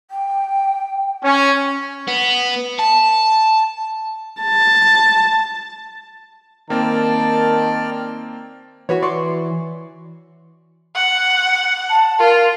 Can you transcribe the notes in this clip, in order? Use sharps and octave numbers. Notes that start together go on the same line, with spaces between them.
G5
C#4
B3
A5
A5
D#3 A#3 C4 D5 G5 A5 F6
E3 F#4 B4 C#5
D5 C6 C#6
F#5
A5
F4 A#4